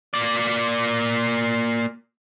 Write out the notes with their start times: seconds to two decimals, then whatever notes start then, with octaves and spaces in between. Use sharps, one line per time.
0.14 A#3 D5